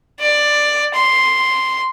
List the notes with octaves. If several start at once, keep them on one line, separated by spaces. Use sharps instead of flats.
D5
C6